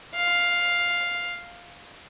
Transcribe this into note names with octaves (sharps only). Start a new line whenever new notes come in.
F5